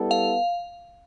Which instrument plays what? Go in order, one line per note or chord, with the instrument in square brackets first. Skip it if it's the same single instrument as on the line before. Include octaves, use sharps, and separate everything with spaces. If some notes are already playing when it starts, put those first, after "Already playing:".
Already playing: [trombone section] G3 B3 E4 A4
[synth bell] F5